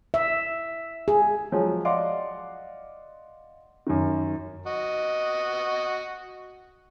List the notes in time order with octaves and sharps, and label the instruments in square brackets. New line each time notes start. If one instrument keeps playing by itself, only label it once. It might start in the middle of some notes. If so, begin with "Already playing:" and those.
[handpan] E5
G#4
[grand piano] F3 F#3 G#3
D5 D#5 F5 F#5 C6 D6
F#2 D#3
[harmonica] F#4 D#5